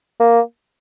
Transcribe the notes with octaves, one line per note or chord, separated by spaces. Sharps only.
A#3